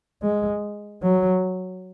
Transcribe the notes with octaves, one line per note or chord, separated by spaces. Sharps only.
G#3
F#3